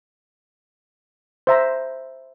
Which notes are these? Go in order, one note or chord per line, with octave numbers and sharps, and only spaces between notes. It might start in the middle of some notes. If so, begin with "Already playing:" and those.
C5 E5 A#5